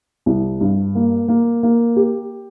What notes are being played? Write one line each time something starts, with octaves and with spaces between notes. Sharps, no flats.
C2
G2
A#3
A#3
A#3
G4